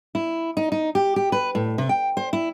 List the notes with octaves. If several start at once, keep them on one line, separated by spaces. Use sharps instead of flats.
E4
D#4
D#4
G4
G4
B4
A2
C3
G5
C5
E4